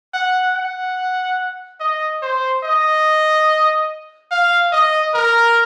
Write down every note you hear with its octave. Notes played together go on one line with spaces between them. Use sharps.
F#5
F#5
D#5
C5
D#5
F5
D#5
A#4